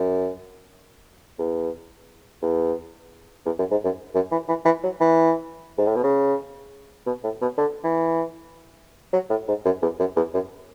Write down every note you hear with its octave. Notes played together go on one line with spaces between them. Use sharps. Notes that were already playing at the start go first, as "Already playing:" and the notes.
Already playing: F#2
E2
E2
E2
F#2
G#2
F#2
F#2
E3
E3
E3
F#3
E3
G#2
A2
B2
C#3
B2
A2
B2
D3
E3
F#3
A2
G#2
F#2
E2
F#2
E2
F#2